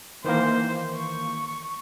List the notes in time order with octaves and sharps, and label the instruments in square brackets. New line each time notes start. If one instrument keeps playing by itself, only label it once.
[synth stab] D#3 E3 A#3 [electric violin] C5
[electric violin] C#6